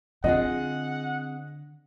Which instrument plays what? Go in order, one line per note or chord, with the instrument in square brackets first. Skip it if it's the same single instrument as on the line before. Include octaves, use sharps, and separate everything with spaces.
[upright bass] D3 [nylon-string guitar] C4 F4 G#4 [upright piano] D#5 [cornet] F#5